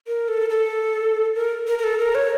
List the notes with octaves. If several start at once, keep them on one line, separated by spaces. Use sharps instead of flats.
A#4
A4
A4
A#4
A#4
A#4
A4
A#4
C#5